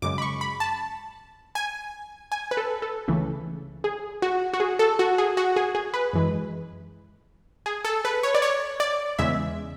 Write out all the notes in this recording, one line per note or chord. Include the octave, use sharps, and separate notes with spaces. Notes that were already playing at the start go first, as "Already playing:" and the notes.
F#2 C#3 G#3 D6
B5
C#6
B5
A5
G#5
G#5
B4
A4
A4
C#2 C#3 E3 A3
G#4
F#4
F#4
G#4
A4
F#4
G#4
F#4
G#4
G#4
B4
F#2 E3 G#3
G#4
A4
B4
C#5
D5
C#5
D5
E2 C#3 G#3 E5